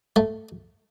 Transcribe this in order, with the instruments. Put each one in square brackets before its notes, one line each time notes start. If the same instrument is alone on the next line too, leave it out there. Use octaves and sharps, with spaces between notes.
[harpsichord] A3